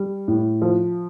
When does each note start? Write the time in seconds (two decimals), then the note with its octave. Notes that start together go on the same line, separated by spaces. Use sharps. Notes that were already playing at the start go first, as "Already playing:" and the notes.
Already playing: G3
0.28 A2
0.62 F3